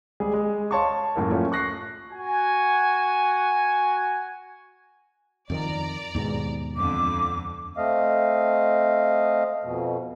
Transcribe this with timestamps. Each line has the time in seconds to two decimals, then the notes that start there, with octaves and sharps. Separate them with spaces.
0.20 G3 G#3 G#4
0.33 G#3
0.71 C#5 F5 A5 C6 C#6
1.16 F#2 A2 A#3
1.30 F3 A3 C#4 F4
1.52 C#6 F#6 A#6 C7
2.11 F#4 G#5
5.50 F2 D#3 D5 A#5
6.15 D#2 G#2 B2
6.76 F2 D3 D6
7.77 A3 C4 D#5 F5
9.64 F2 B2